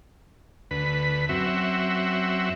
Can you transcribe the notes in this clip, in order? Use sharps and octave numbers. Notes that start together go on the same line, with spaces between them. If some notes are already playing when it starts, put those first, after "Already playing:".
D2 B4
F#2 C4 F#4 E5